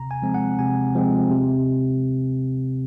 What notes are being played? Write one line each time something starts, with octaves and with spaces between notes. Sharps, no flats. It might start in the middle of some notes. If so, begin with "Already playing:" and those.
Already playing: C3 A#5
G#5
F3 G#3 C4
F#5
C3 G#5
F3 G#3 C4
C3